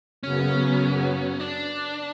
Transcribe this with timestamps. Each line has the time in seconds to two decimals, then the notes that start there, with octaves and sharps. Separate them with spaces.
0.23 F#2 C#3 F#3 B3 C#4
1.40 D4